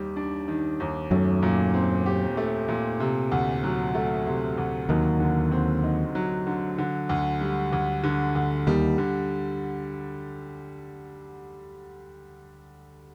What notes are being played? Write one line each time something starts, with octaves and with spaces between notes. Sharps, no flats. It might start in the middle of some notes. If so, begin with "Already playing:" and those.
Already playing: D#2 D#3 G3
D4
D#3
D#2
F#2 F#3 A3
A#2
C4
G4
A3
A#2
C3
D2
F#3
A3
C3
D2
D#2 D#3 F#3
D3
C4
D#4
F#3
D3
D3
D2
G3
D2
D3
D2
D#2 D#3 G3
D3